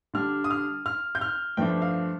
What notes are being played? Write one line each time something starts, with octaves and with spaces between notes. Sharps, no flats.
D3 G3 D4 F6
D#6
F6
F6
G6
F6
G2 F3 A3 D4 G5
F5